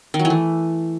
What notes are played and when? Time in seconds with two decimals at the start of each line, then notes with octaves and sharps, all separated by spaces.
0.14 D#3
0.19 F#3
0.25 E3
0.30 A3